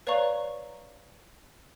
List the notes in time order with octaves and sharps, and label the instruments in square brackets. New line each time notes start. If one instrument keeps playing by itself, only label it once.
[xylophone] B4 C#5 D5 F5 A#5 C#6